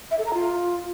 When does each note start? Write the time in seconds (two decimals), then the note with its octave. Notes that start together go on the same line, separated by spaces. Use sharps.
0.11 E5
0.19 A4
0.26 A#5
0.34 F4